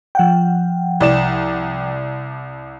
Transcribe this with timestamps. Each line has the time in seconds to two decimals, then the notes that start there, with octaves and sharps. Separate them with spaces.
0.15 F3 F#5 G5
1.00 C2 D5 E7